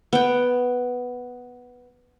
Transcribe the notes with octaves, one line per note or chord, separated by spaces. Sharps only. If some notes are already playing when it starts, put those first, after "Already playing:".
B3 G5